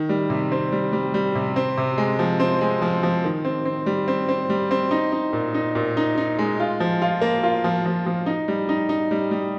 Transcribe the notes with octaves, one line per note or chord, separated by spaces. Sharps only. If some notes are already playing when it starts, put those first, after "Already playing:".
Already playing: D#3
G3
C3
C4
G3
G3
G3
C3
C4
C3
G#3
F3
C4
G#3
F3
F3
D#3
C4
C4
G3
C4
C4
G3
C4
D#4
D#4
A#2
D#4
A#2
D#4
D#4
G#3
F4
F3
F4
A#3
F4
F3
F3
F3
D#4
G3
D#4
D#4
G3
G3